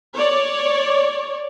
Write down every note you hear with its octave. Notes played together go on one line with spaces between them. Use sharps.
C#5 D5